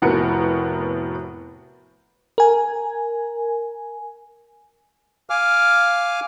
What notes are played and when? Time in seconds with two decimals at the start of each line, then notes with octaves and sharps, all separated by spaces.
0.02 F1 A2 B3 F#4 A#4 C#7
2.38 A#4 G#5
5.30 F5 G#5 D6 F6